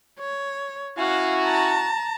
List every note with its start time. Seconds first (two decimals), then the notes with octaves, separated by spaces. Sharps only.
0.19 C#5
0.98 C#4 E4 F#4 F5
1.44 A5 A#5